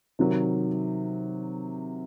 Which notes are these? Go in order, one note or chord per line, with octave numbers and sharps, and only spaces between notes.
C3 D#3 F#3